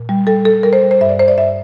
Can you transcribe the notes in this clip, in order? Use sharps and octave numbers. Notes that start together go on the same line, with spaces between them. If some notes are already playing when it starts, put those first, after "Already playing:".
Already playing: A#2
G3
G3 A4
G3 A4
G3 A#4
C5
G3
C5
G2 E5
D5
G2 C5
D5
G2 E5